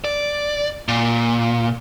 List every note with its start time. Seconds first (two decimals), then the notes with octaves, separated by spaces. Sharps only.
0.04 D5
0.88 A#2